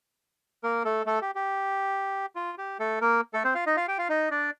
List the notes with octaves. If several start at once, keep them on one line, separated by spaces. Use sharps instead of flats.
A#3 A#4
A3 A4
A3 A4
G4
G4
F4
G4
A3 A4
A#3 A#4
A3 A4
C4 C5
F4 F5
D#4 D#5
F4 F5
G4 G5
F4 F5
D#4 D#5
D4 D5